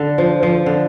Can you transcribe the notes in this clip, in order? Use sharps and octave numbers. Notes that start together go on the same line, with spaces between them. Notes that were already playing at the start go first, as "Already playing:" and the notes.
Already playing: D3
F3
F3
D3